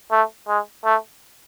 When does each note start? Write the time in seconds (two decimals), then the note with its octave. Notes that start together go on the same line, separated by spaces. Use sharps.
0.11 A3
0.48 G#3
0.85 A3